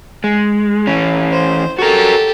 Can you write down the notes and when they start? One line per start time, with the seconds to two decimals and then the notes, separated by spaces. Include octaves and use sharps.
0.24 G#3
0.87 E3 C#4
1.31 C5
1.79 F#4 G4 A4 A#4